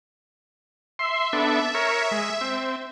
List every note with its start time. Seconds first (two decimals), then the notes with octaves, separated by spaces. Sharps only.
0.99 E5 C6
1.33 B3 D4 A4
1.75 A#4 C#5
2.11 G#3
2.41 C4